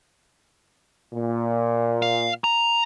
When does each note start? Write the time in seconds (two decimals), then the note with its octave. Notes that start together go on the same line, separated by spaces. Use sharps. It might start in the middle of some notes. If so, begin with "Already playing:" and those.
1.13 A#2
2.02 F5
2.44 A#5